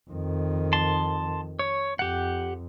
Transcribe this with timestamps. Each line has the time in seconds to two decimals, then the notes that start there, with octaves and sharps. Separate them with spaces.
0.10 F2 D#3
0.73 A5 C6
1.59 C#5
1.99 F2 G4 F#5